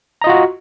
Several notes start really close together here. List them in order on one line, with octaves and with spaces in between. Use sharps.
A#5 D#5 F4 F#4